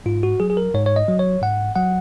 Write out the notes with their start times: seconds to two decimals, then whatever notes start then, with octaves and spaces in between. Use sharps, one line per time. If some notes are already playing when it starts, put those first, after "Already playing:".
0.06 G#2 F4
0.23 F#4
0.40 F#3 G#4
0.50 G#4
0.57 A#4
0.75 G#2 C#5
0.86 C#5
0.96 D#5
1.08 F#3
1.19 C#5
1.42 G#2 F#5
1.76 F#3 F#5